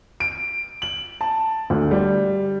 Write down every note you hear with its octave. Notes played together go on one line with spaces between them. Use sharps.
D7
F#7
A5
D2
G3